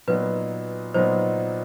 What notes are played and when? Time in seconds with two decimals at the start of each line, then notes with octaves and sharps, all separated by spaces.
0.08 A#2 F#3 B3 D#4 B4
0.94 A#2 F#3 B3 D#4 C5